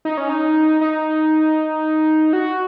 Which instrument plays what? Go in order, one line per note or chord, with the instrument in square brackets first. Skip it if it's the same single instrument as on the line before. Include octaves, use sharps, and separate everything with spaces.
[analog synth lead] D#4
C#4
D#4
D#4
F#4